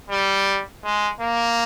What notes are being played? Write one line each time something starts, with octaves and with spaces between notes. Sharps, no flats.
G3
G#3
A#3